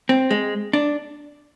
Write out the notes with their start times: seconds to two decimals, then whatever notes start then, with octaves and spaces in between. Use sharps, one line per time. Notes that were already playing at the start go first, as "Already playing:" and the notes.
0.09 C4
0.31 G#3
0.73 D4